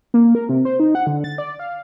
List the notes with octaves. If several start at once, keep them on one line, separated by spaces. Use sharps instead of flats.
A#3
A#4
C3
C5
D#4
F#5
D3
A6
D5
F5